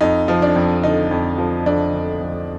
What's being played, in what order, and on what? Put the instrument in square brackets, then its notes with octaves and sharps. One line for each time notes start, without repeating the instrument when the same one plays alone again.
[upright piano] F2 D#4
F3
D4
F2
D3 D#4
F2
F3
F2 D4
D3
F2